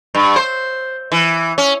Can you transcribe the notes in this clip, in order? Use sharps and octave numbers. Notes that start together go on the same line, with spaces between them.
G2
C5
E3
C#4